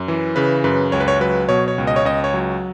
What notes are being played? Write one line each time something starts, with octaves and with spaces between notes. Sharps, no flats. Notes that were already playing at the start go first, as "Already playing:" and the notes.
Already playing: F#2
E3
C#3 B4
F#2 B4
C#2 C#5
B4
C#5
F#3 B4
B2 C#5
C#5
C#2
D#5
C#5
C#2 D#5
C#5
F#3